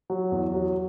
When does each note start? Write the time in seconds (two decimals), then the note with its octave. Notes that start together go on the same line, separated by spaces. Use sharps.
0.10 F#3
0.32 E2
0.54 F#3